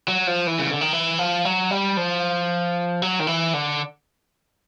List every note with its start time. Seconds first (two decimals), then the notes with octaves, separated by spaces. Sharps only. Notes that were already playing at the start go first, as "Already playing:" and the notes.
0.08 F#3
0.27 F3
0.47 E3
0.59 C#3
0.70 D3
0.81 D#3
0.93 E3
1.19 F3
1.45 F#3
1.71 G3
1.97 F3
3.02 F#3
3.20 D#3
3.27 E3
3.54 D3